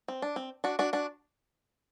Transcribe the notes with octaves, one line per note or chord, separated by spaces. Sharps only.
C4
D4
C4
D4 F#4
D4 F#4
D4 F#4